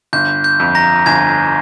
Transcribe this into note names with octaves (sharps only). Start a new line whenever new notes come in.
G1 G6
G6
F2
A#5 A#6
G1 G#5 G#6